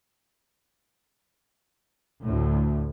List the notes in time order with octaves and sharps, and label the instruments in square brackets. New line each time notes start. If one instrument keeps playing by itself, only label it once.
[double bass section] D2 A2